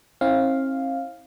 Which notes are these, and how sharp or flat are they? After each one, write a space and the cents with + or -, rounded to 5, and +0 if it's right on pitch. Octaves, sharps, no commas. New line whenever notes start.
C4 +40 E4 -35 F5 +0